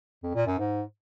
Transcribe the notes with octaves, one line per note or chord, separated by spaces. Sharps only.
F2
A#2
F#2
G#2